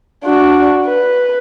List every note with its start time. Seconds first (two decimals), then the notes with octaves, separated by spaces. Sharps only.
0.24 D4 F#4
0.85 B4